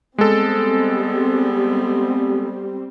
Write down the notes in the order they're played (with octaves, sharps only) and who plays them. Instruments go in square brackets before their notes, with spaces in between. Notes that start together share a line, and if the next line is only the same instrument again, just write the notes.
[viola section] G3 C4 [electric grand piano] G#3 A4 [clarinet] B3